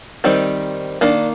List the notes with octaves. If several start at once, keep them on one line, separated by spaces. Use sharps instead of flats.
D#3 G3 C4 D#4
D#3 A#3 D4